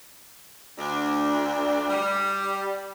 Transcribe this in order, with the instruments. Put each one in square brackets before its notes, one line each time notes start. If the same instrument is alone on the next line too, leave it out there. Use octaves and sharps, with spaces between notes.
[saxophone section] D2 D4
G3